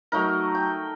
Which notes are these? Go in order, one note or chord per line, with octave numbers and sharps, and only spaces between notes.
F#3 A3 D#4 A#4
G5